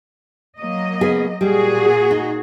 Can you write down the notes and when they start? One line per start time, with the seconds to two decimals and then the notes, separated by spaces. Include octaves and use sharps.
0.58 F#3 A#3 D#5
1.01 C#3 B3 G#4
1.41 A#2 G3 F#4 G#4
2.11 D#4